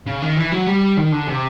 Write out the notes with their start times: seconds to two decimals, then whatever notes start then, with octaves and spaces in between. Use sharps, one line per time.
0.06 C#3
0.22 D#3
0.37 E3
0.52 F#3
0.66 G3
0.97 D#3
1.12 D3
1.27 C3